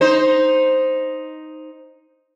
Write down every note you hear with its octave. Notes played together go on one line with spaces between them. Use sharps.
D#4 C5